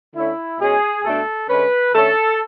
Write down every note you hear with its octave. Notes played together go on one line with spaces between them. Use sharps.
D3 A3 C#4 E4
B2 G#3 C#4 G#4
B2 A3 D4 A4
D3 G#3 C#4 B4
D3 A3 C#4 A4